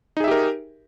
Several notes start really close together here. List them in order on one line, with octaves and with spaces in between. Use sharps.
D#4 G#4 E5 G4 A#4